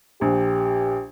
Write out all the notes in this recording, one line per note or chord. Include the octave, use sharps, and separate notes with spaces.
A#1 G4